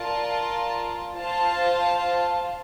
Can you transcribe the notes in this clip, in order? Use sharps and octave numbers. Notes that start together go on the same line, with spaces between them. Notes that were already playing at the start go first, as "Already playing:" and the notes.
Already playing: F4 A#4 D5 A5
F4 C5 F5 A5